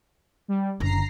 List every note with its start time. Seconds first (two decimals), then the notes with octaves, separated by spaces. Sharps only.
0.48 G3
0.80 F#1 D3 A#5 A#6 C7